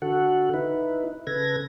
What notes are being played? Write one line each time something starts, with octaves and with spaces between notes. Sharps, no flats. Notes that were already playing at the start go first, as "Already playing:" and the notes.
D3 F#4 A4 F#5
D#4 E4 B4
C#3 A4 B4 G#6 A#6